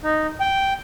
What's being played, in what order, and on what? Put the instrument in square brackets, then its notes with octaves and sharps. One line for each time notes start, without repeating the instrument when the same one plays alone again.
[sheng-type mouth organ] D#4
G5